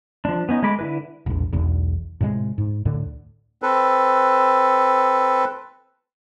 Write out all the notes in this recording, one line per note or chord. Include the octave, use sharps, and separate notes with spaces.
F3 D4
B3 C#4 D#4
G#3 A3 B5 D6
D3 E4 B4
E1 A#1
E1 B1 E2
A2 C3 G3 G#3
G#2
D2 A2 D3
C4 A4 B4